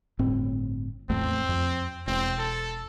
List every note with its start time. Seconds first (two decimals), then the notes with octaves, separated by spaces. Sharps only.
0.19 G1 A2 C4
1.10 A1 E2 A3 C4
1.49 F2
2.07 E1 C4
2.39 A4